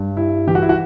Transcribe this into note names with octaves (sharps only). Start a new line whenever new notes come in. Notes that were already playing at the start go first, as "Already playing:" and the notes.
Already playing: G2
G3 E4
E3 G4
F#4
E4
F#4